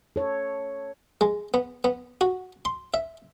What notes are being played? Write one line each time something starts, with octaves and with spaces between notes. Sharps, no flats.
A4 C#5
G#3
B3
B3
F#4
C6
E5